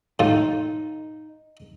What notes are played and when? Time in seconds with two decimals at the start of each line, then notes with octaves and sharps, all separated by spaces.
0.19 A2 D#4 F4